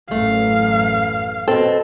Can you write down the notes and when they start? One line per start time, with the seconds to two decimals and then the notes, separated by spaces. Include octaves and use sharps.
0.11 A1 F#2 A2 A3 F5
1.48 B2 C4 A4